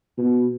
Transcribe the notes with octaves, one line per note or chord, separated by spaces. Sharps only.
B2